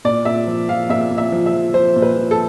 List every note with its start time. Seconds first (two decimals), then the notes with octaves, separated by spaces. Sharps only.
0.05 A#2 D5
0.25 A#2 E5
0.47 F3
0.69 F3 F5
0.89 A#2 E5
1.11 A#2
1.18 E5
1.32 F3
1.46 E5
1.53 F3
1.74 F3 C5
1.96 A#2
2.02 B4
2.17 F3
2.31 A4